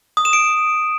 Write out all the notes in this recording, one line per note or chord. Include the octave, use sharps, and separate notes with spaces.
D#6
E7
D7